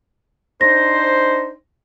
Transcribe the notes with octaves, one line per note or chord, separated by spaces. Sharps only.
D4 D#4 C5 A#6